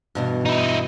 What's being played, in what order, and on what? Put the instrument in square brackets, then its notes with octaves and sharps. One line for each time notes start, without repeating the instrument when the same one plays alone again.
[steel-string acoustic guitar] G2 B2 E3
[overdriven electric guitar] D#4 E4